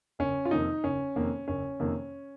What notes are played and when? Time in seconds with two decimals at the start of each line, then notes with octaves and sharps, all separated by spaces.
0.19 F#1 C#4
0.45 F4
0.51 F2 C3 D#3 A#3 D#4
0.84 F#1 C#4
1.15 F2 C3 D#3 A#3
1.48 F#1 C#4
1.80 F2 C3 D#3 A#3